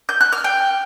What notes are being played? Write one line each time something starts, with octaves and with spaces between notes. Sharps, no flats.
G6
F#6
F6
G5